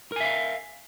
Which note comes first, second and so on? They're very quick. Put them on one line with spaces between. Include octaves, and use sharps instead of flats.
A#4 G#5 E5 F5